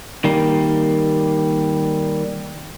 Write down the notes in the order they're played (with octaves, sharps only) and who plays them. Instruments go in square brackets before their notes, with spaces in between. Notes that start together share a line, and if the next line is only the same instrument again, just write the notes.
[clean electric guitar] D#3 G3 A#3